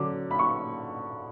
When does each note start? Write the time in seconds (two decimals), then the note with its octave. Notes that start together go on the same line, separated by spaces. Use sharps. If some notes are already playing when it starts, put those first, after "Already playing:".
Already playing: D3 F#3 C#4 D6
0.31 B5
0.39 C#6